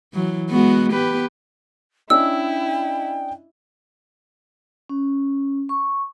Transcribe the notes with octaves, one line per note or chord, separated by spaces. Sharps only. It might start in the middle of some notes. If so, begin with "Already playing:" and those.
E3 F#3
G#3 B3 F#4
B3 G4 B4
C#4 D4 E4 D#5 G5 E6
C#4
C#6